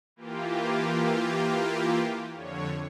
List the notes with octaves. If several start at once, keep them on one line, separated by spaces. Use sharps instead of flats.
E3 A#3 F4 G4
F2 D3 C#5